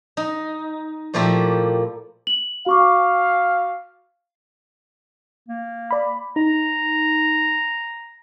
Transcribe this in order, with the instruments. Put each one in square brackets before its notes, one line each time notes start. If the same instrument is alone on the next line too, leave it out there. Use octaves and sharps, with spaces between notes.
[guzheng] D#4
A#2 F3 A3 A#3 E4 G4
[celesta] F#7
[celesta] F#4 C#6 D6 [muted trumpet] F5
[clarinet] A#3
[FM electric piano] D5 B5
[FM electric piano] D#4 [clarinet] A#5